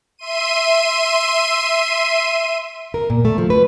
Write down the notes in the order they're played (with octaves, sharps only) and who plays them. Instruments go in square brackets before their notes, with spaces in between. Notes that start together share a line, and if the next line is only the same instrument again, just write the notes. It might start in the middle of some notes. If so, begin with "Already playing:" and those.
[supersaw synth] E5 C6 D#7
[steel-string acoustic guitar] A#4
A#2
A3
F3
B4